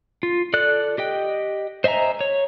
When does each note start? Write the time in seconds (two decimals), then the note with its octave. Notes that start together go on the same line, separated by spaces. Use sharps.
0.23 F4
0.54 A4 D5 F#6
0.98 G4 D#5 G5
1.84 C5 D#5 E5 G#5 A#5
2.21 C#5